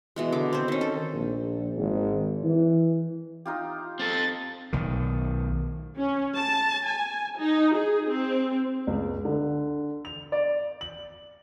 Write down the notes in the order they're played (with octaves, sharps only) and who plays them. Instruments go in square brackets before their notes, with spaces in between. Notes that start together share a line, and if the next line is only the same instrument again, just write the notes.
[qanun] B2 E3 G#3
D3 D6
C4 C5
D#3 C#4
A4
[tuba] A#1
G#1
E3
[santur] D#4 F4 G4
[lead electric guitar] C4 A4 [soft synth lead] A6
[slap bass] B1 D#3
[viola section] C#4
A5
G#5
D#4
G#4
C4
[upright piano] C#2
D3
F7
D5
F#7